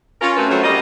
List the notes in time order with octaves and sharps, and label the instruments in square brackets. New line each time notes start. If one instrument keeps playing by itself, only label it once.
[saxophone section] C#4 F4 A#4
A3 C4 C#4 F#4 A#4 B4
F#3 G3 A3 C4 C#4
G3 A#3 D5 D#5